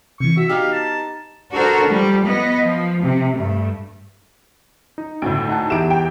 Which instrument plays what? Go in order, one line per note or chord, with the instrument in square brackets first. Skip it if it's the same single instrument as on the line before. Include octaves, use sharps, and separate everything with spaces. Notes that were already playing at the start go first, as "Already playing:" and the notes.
[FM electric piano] C3 E3 [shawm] C#6
[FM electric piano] F#4 [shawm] E5
[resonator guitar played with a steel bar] B3 D#4 G4 [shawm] F5
[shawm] A5
[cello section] D4 F#4 A4 A#4 C5
F3 G3
B3 D#5
F3
C3
G2 A3
[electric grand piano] D#4
[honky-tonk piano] D2 A2 [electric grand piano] D7
[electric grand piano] D#4 F#5 A5
[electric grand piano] E2 G4 E5 [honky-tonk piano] D7 E7
[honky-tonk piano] G5